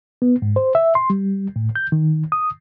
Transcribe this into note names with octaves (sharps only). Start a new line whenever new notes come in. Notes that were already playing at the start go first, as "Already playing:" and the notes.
B3
G#2
C5
E5
C6
G3
A2
G6
D#3
D#6